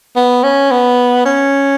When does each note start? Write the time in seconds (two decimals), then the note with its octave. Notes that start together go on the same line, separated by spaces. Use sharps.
0.16 B3
0.44 C#4
0.71 B3
1.26 C#4